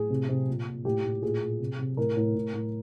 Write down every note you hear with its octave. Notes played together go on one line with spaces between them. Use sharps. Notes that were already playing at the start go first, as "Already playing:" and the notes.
Already playing: A2 G#4
C3
C3
A#2
A#2
A2 G4
A2
A#2 G#4
A#2
C3
C3
A2 A#4
A2
A2
A2